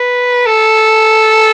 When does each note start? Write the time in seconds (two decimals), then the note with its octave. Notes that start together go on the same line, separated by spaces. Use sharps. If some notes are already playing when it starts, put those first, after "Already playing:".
Already playing: B4
0.46 A4